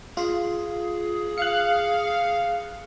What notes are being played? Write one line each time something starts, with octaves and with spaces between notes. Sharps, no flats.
F4 G#4
F5 F#6 C#7